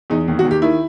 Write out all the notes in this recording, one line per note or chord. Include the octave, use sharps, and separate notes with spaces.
E2 D#4
D#2
F#4
D#2
G4
D#3 E4